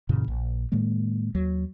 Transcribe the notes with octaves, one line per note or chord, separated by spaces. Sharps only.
F#2 A#2 C#3 E3
A#1
A2 D#3 G#3 A#3
D#2 F#3